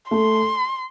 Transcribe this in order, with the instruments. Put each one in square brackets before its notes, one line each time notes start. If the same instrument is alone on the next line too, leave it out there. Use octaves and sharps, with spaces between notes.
[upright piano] A3 [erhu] C6